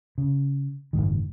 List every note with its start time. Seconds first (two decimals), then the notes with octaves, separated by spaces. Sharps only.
0.18 C#3
0.93 F#1 C2 G#2 D#3